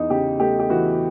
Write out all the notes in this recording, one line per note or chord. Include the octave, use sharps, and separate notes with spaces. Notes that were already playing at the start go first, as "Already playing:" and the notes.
Already playing: E2 D#4
C#3 G4
A3 G4
G4
E3 F#4